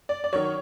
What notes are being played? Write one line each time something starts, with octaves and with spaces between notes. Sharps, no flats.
D5
D5
D#3 F#3 C#5